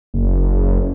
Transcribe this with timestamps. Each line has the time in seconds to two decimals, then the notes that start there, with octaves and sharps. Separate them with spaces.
0.14 F#1